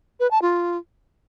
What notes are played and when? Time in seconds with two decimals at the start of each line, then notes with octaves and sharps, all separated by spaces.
0.20 B4
0.31 A5
0.42 F4